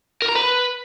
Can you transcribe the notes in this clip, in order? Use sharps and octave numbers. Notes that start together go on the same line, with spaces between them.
A#4
A#5
B4